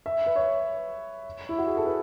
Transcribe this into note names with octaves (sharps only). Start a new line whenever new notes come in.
E5
B4
C#5
E4
F#4
G#4
A4
B4